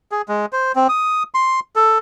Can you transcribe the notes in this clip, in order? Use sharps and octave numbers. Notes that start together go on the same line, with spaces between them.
G#4
G#3
C5
C4
D#6
C6
A4